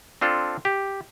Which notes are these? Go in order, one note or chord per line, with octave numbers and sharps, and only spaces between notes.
C4 D4 F4 A4
G4